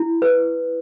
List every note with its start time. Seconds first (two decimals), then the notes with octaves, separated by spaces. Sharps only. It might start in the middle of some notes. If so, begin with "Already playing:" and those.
Already playing: E4
0.22 B4